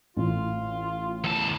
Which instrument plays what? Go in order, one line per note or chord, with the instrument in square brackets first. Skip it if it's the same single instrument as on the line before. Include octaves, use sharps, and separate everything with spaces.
[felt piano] A1 [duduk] F4
[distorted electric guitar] E2 A5